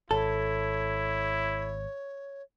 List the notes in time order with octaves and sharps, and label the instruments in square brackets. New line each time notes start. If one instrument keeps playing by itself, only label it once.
[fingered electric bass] G#1 [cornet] E4 [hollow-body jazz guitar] A4 [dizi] C#5